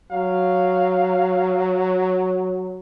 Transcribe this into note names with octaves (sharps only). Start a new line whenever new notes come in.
F#3 F5